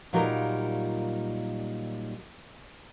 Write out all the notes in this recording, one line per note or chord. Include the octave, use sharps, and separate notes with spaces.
A#2 F#3 G3 D#4 F4 A#4